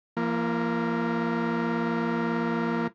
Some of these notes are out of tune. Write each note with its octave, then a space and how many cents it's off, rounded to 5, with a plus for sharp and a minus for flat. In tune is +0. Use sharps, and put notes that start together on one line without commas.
F3 -40 A#3 +0